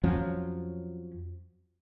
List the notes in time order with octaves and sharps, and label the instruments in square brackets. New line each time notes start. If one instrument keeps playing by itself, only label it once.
[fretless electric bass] F2 F3 F#3 C#4